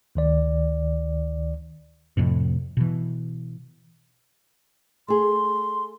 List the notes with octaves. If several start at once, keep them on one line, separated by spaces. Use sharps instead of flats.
D2 D#3 D5
F2 A2 C3
B2 E3
A3 G#4 C6